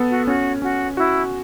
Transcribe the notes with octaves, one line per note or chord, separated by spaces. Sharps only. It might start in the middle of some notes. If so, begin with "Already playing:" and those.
Already playing: B3 A4
F#4
C#4 F#4
C#4 F#4
E4 F#4